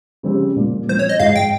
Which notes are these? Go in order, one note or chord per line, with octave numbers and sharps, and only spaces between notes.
C#3 F3 C4 G4
A#2
F3 C4 C5
C#5
D#5
G#2 F5
G5